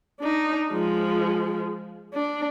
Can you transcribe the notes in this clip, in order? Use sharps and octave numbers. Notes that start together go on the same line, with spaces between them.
D4 D#4
F3 G#3
D4